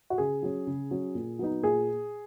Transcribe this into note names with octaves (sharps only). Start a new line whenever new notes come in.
F#4
C#3 G#4
F#3 C#4
C#3
F#3 C#4
A#2
F#3 B3 D#4
A#2 G#4